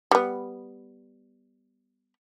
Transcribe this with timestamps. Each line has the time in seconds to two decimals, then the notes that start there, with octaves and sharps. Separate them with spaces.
0.11 G3 B3